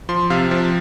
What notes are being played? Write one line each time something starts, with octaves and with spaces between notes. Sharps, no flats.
F3 C6
C3 F5
F3